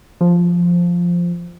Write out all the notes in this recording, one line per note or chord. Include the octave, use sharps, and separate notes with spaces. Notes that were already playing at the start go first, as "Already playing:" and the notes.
F3